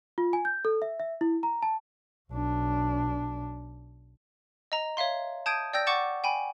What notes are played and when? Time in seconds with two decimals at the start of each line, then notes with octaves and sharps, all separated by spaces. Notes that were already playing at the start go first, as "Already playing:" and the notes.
0.18 F4
0.33 G#5
0.45 G6
0.65 A4
0.82 E5
1.00 E5
1.21 E4
1.43 A#5
1.62 A5
2.31 B1 D4
4.72 D#5 A#5
4.97 C#5 E5 F5 C6
5.46 A5 D#6 G6 G#6 D7 D#7
5.73 D5 G5 E6 G6 A#6
5.87 F#5 C#6 D6 A6 C#7 E7
6.24 G5 G#5 B5